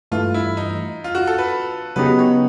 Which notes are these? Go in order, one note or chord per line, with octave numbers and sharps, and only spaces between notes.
G2 E3 A3 F4
E4
D#4
F4
F#4
A4
B4
C#3 F#3 B3 D#4 G4 B4
C#5